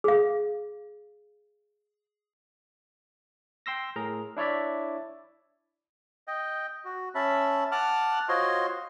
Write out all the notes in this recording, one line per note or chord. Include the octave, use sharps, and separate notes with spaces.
G#4 F5
G5 C6 E6 A#6
A2 G#4 A#4 A#5
D4 E4 C#5 D5 E5
D#5 G5
F#4
C#4 E5 A5 B5
F#5 A5 D6 F6 F#6
F4 F#4 C5 C#5 D#5 C6